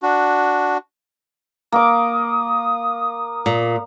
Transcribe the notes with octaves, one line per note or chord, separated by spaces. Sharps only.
D4 F#4
A#3 D6 D#6
A#2